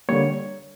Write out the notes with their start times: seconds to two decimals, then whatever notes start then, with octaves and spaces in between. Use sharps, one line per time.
0.09 D3 G3 A#3 C#5